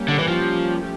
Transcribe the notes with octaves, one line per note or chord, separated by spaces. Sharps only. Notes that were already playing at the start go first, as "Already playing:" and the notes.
Already playing: G3 A#3 C#4 G4
D3
E3
F3
F3 A3 C#4 G4